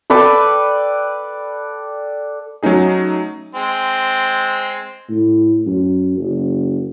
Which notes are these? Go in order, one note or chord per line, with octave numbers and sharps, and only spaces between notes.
A4 B4 D5 G5
F#3 A3 C#4 D#4 G#4
G#3 C4
A2
F#2
F#1